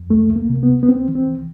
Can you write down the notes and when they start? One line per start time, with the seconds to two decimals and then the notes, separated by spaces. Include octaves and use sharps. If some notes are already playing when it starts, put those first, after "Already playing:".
Already playing: F2
0.10 C2 A3
0.29 C2
0.36 A#3
0.50 C3
0.63 B3
0.69 C2
0.83 B3
0.89 C2 C4
1.08 E3
1.15 C4
1.28 C2